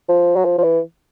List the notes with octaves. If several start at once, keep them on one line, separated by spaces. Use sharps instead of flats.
F3
F#3
F3
F3
E3